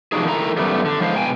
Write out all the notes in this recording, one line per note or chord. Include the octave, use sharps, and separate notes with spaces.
C3 F3 F#3 D4 D#4 G#4
D#3 A3 D4 E4 A#5
F#2 G3 A3 B3
D3
F3 G#3 E4 C5 F5
B2 G5 G#5